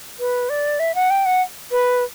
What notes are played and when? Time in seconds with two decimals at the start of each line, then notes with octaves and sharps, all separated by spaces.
0.20 B4
0.49 D5
0.79 E5
0.95 F#5
1.10 G5
1.25 F#5
1.71 B4